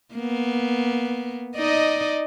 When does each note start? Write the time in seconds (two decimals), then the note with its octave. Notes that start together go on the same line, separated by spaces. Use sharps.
0.14 A#3 B3
1.57 D#4 D5 D#5